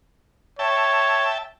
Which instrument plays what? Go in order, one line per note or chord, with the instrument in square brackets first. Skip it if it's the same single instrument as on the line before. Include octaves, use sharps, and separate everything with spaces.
[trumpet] C#5 [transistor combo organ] E5 G5 A5